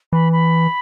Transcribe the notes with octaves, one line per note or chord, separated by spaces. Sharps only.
E3 B5
B5